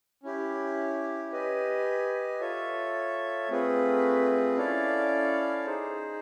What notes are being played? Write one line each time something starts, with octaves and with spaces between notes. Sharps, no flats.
C#4 E4 G4
G4 B4 D#5 G#5
F4 A4 C#5 E5
A3 C4 F4 G#4 B4
C#4 E4 A4 D5 F5
D#4 G#4 C5